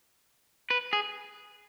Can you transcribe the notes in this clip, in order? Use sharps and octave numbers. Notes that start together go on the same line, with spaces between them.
B4
G#4